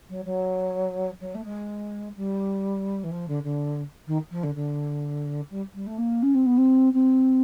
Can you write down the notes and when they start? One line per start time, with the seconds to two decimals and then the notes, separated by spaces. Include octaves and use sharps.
0.09 F#3
0.25 F#3
1.20 F#3
1.34 A3
1.44 G#3
2.16 G3
3.03 E3
3.11 F3
3.28 D3
3.43 D3
4.06 D#3
4.30 F3
4.43 D3
4.55 D3
5.50 G3
5.74 G3
5.86 A3
5.98 A#3
6.22 C#4
6.34 C4
6.45 B3
6.57 C4
6.93 C4